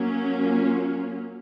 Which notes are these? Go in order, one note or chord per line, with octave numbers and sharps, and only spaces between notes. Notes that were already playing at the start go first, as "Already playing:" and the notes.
Already playing: F#3 A#3 C#4
F4